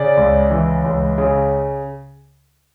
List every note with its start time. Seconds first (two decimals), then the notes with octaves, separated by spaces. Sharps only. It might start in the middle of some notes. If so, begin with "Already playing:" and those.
Already playing: C#3 D5
0.17 C#2
0.51 E3
0.84 C#2
1.18 C#3